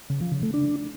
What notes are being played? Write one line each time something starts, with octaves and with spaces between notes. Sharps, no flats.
C#3
F3
C#3
A3
D4